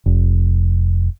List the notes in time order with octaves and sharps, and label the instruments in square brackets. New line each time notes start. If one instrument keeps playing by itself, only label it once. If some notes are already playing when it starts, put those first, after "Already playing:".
[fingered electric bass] F1